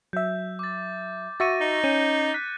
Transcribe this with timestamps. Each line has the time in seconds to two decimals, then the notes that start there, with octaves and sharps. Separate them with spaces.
0.13 F#3 E5 G6
0.59 D6 A6
1.40 F#4 E5 C#6 A6 A#6 D#7
1.61 D#4
1.84 C#4 G6 C#7 D#7
2.34 F#6 B6